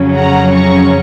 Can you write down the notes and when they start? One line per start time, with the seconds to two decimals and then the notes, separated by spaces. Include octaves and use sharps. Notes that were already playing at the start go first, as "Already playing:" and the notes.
Already playing: F2 C#3 F#3 C#4
0.15 F#5 A#5
0.53 A#5 C#6